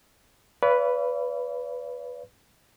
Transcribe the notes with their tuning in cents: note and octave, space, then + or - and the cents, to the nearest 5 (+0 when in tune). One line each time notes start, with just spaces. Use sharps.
B4 +0 D5 -45 F5 -40